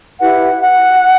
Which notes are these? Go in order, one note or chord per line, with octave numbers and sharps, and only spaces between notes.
E4 G4 B4 F#5
F#5